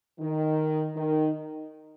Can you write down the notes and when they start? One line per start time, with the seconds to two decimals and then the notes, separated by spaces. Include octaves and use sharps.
0.20 D#3
0.96 D#3